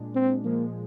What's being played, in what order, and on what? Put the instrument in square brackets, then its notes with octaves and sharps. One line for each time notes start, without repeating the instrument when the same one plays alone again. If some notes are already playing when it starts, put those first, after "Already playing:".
Already playing: [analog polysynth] A#2 G#3 D4
[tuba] C4
[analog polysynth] A#2 F3 G#3 [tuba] A#3